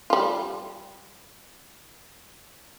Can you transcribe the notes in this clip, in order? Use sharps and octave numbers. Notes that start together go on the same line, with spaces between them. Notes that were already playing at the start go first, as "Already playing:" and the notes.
G3 F4